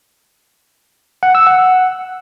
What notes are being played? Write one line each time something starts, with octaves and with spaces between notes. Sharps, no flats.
F#5
E6
F#5